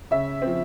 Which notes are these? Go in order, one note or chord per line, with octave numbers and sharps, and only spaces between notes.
C#3 E5
F3 C4